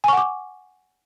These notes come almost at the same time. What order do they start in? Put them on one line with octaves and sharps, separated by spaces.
G#5 C#6 F#5 D6